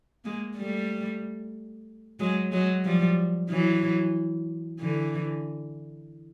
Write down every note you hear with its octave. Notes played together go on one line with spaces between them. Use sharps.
G#3 A#3
G3 A3
F#3 G#3
F#3 G#3
F3 G3
E3 F#3
D3 E3